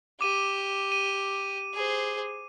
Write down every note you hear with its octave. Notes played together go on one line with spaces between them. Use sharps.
G4 D6 D#7
D#7
G#4 C5